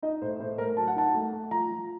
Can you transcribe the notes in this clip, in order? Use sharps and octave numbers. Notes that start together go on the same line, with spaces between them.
D#4 D#5
A2 C5
A2 C5
A3 A#4
F#3 A5
F#5
D#4 A5
A3
A3
F3 A#5
F3